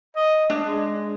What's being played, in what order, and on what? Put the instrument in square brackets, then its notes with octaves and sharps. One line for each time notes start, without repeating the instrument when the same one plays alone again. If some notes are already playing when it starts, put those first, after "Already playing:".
[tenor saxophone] D#5
[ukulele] D4
[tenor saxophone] G#3